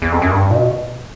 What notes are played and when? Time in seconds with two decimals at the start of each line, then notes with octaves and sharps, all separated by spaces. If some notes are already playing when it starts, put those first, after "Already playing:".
0.02 E2
0.12 F2
0.22 F#2
0.31 G2
0.51 A#2
0.55 B2